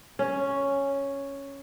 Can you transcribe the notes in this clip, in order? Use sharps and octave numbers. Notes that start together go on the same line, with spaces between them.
C#4